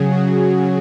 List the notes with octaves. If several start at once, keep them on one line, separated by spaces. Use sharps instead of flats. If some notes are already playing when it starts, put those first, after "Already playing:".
Already playing: C#3 F#3 G#4
F#4